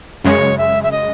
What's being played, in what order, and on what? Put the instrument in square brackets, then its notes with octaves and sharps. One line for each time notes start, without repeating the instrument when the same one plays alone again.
[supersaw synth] F#2 C#3 G#3 [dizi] C#5
[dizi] E5
E5
D#5